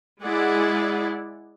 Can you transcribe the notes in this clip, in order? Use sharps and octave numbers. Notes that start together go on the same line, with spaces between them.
G#3 E4 G#4 D5 F#5